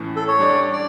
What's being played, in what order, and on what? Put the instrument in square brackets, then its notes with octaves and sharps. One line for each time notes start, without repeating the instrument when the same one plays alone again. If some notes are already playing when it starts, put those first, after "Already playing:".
Already playing: [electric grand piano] A2 E3 A3 C#4
[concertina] A4
C#5
[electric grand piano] G3 D4 G4 D5
[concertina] D5